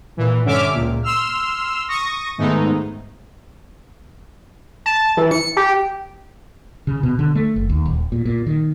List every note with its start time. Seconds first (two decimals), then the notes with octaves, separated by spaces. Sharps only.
0.17 A#2 E3
0.44 G2 D3 C#4 E5 D6 F6
0.73 C#2 A#2
1.02 C6 E6 F6
1.88 C#6 D#6 A#6
2.38 G#2 D#3 G#3 A3 B3 D#4
4.86 A5
5.17 E3
5.31 C#7
5.57 G4
6.87 C#3
7.03 B2
7.19 D3
7.35 A3
7.56 F#1
7.69 D#2
7.86 D#1
8.12 A#2
8.26 A#2
8.46 D#3